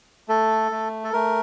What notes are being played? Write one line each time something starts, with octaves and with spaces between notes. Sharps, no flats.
A3 A4
A3
A4
A3 A#4